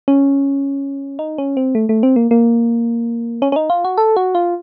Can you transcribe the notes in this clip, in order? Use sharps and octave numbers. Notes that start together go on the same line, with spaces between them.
C#4
D#4
C#4
C4
A3
A3
C4
A#3
A#3
C#4
C#4
D#4
F4
F#4
A4
F#4
F4